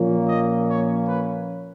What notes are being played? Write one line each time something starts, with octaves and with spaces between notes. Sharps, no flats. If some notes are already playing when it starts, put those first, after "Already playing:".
Already playing: A#2 F3 A#3 C#4
D#5
C#5
B4